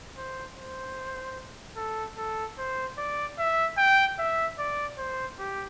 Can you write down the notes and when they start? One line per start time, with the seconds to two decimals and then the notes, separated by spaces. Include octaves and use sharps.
0.17 C5
0.57 C5
1.77 A4
2.17 A4
2.58 C5
2.98 D5
3.39 E5
3.78 G5
4.19 E5
4.59 D5
4.98 C5
5.39 G4